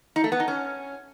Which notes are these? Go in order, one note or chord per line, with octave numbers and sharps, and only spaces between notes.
D#4
A3
B3
D#4
C#4